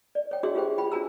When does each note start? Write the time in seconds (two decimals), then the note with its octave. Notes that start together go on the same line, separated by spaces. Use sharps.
0.15 D5
0.31 C#5 G5
0.43 D4 F#4 G#4 E5 C6
0.55 F4 G4 G#4 C5 G5
0.78 F4 G5 B5
0.92 D4 F4 F#4 G#5 A#5 E6